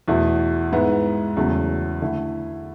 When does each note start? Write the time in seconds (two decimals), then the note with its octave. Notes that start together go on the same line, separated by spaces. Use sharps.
0.08 E2 B2 A3 E4
0.73 G#2 G#3 B3 E4
1.37 E2 C#3 F#3 A3
2.02 D3 A3 E4